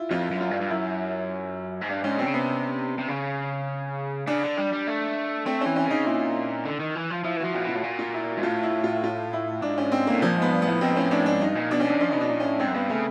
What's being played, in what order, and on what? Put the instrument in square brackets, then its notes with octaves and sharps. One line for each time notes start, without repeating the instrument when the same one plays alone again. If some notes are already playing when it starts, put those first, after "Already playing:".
Already playing: [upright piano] E4 F4
[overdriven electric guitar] F2 [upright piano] F4
[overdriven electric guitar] F#2
[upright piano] F4
[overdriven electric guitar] G2
G2
[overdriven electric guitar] F#2 [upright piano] E4
[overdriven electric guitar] G#2
[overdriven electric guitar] G2 [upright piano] D4
[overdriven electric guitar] G#2 [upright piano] C#4
[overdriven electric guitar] B2 [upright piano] C4
[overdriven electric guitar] C#3
[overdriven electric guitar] C3 [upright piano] B3
[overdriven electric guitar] C3
C#3
[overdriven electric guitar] C#3 [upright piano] D4
[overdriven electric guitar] D3
G3
G3
A3
[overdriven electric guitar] A3 [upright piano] C4
[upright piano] C#4
[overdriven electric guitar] E3
[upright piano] C#4
[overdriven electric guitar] C#3 [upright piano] D#4
[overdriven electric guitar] A#2 [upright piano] E4
[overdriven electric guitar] D3
D#3
E3
F3
[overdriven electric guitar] F3 [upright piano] E4
[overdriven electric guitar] E3
[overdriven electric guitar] F3 [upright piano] F#4
[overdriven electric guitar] A#2 [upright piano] F#4
[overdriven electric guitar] B2 [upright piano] F4
[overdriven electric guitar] A2
[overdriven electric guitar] A#2 [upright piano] F#4
[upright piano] F4
E4
F#4
[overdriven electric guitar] G#2
[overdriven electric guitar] A2 [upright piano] F4
[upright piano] E4
F4
F4
E4
[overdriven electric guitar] G#2 [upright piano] D4
[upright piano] C#4
C4
A#3
[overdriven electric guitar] A2
[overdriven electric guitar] A#2 [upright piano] F3
[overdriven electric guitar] G#2 [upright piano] B3
[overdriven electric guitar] G2
[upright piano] B3
[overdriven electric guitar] A2
[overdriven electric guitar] B2 [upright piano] C4
[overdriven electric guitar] G#2
[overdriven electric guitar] A2 [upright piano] C#4
[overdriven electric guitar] A2 [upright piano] D4
[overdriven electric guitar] G#2 [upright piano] D4
[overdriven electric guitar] G2 [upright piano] D#4
[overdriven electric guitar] A#2
[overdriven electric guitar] B2 [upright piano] D4
[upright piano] C#4
[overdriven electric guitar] B2 [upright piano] D4
[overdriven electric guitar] F3 [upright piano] C#4
[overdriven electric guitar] B2 [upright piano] D#4
[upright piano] D4
[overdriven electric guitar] A#2
[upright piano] C#4
[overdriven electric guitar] A2
[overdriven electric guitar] G#2 [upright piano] C4
[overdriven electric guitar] F#2
[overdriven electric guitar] G2 [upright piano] B3
[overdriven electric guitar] C#3 [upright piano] A3